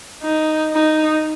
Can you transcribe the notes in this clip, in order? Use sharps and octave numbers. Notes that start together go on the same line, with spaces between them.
D#4
D#4